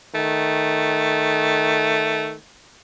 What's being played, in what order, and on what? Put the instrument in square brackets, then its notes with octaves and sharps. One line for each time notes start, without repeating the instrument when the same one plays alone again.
[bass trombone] D#3 [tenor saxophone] A3